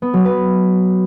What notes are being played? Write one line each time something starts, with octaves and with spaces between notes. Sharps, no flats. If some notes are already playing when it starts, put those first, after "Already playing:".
B3
F#3
B4